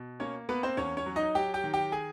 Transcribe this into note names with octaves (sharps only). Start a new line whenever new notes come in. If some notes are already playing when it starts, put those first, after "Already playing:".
Already playing: B2
A#3 C#4 C#5
A#3 B3 B4
C4 C5
E2 C#4 C#5
C#4 C#5
F#3
D#4 D#5
F#3 G4 G5
G4 G5
D#3
G4 G5
G#4 G#5